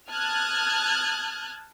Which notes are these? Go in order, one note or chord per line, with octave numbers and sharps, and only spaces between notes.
A5 D#6 F6 F#6 G#6 A6